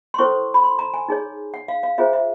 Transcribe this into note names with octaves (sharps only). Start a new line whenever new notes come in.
C6
C#4 E4 A4 C5 C#6
B5
C6
A#5
G#5
D#4 G#4 C#5
F#5
F5
F5
C#4 F4 G#4 C5 E5
E5